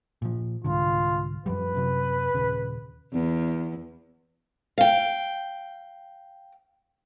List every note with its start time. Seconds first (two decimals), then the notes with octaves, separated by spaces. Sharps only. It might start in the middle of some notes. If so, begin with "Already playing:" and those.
0.22 A#2 F3
0.65 C2 G#2 D3 F4
1.46 F#2 F3 G3 B4
1.74 F#2 C3 F#3
2.35 D#1 C#3
3.12 E2
4.78 F5 G5